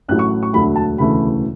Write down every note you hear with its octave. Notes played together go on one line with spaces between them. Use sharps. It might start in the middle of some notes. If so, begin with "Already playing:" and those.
A1 A2 F#3 A3 F#6
C#6
C#6
E1 D2 D3 F#3 A3 B5
A5
E1 D2 C#3 E3 A3 B5